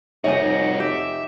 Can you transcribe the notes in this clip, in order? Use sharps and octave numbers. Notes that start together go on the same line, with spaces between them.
F1 G3 D#4 F#4 C#5 D#5 G#5
G4 E5